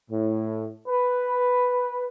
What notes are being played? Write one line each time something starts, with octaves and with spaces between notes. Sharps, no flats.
A2
B4